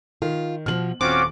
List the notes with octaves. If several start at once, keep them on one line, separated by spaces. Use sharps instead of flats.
D#3 F4
B2 D3 F3 F6 F#7
D#1 C4 C#4 F4 F#4 D6